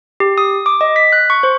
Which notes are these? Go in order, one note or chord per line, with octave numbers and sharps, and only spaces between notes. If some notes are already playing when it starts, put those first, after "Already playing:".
G4
D#6
D6
D#5
B6
F#6
C#6
C5